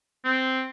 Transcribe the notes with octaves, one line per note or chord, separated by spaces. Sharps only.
C4